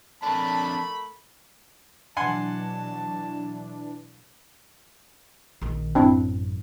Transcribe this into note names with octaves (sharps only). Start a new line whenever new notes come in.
F2 A3 D4 A#4 A5 B5
B2 E3 F#3 D4 F#5 G#5 A5 C6
A#1 D#3
A1 F#2 C4 D4 E4